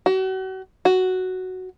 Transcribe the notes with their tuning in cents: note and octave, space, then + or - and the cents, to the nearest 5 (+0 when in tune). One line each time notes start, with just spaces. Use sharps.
F#4 +40
F#4 +5